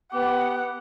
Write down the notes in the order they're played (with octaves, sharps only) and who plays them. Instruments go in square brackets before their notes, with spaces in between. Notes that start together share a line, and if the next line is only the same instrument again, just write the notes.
[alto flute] B3 [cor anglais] G4 [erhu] F#5